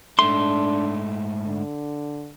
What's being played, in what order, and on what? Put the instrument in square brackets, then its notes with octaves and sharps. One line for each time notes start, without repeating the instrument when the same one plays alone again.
[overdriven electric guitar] G#2 A3 [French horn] D4 [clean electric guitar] C6
[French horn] D3